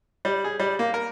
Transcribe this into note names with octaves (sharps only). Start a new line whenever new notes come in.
G3
G#4
G3
A#3
A#4